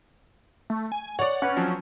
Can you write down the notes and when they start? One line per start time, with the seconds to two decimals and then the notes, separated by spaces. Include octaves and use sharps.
0.70 A3
0.92 G#5
1.19 C#5 D5 F#5
1.42 C#4 B4 F#5
1.56 F3 F#3 C4